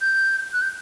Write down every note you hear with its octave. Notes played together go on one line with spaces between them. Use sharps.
G6
F#6
G6